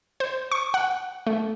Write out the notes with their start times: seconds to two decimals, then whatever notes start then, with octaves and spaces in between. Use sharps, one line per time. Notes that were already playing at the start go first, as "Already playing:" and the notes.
0.20 C5
0.52 C#6
0.74 F#5
1.26 A3